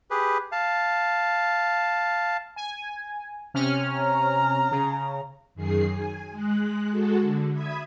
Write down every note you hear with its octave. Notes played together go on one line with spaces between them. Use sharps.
G4 G#4 B4
F5 A5
G#5
C3 C#4 F6
A#5
C#3
F#2 D#3 G#4 C7
G#5
G#3 F#6
G#3 F#4 A4
D3
E5 B5 D#6 G#6